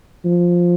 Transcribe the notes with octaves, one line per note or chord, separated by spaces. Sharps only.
F3